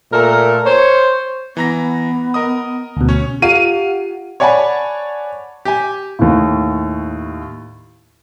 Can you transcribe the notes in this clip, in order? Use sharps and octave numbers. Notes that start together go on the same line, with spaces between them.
A#2 A3 A4 A#4
C5 C#5
E3 B3 A#5 A#6
A#4 D#5 D#6
D2 B2
C#4 C#5
F4 G4 F5 F#5 D#7
C#5 D5 F#5 G#5 A5 B5
G4 G#5
D#2 A2